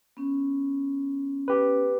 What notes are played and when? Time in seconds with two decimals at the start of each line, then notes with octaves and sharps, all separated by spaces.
0.17 B3 C#4
1.48 G4 B4